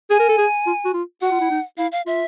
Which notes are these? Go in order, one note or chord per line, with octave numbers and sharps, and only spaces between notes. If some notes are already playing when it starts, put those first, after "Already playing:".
G#4 G#5
A#4
A4
G#4
F4
F#4
F4
F#4 F#5
F4
E4
D#4
E4 F5
F5
F4 E5